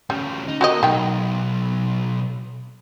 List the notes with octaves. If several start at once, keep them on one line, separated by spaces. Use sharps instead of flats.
D2 G3 C#4
D#4
A#3 F#4 G4 A#4 D#5
B1 D#3 G5